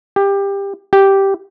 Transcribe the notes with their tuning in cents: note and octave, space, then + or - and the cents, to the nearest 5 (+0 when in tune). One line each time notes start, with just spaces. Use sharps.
G4 +20
G4 -5